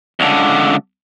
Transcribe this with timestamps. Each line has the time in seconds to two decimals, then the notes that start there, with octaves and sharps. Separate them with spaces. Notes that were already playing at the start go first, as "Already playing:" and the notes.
0.20 C#2 D3